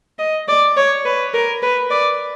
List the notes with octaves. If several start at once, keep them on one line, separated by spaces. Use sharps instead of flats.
D#5
D5
C#5
B4
A#4
B4
D5